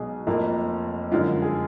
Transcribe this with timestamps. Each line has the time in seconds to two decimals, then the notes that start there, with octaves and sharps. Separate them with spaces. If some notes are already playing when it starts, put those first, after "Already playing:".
Already playing: B1 B2 G#3 G#4
0.27 F1 F2 F3 A#3
1.12 F#2 D3 F3 G#3 F4
1.42 G#4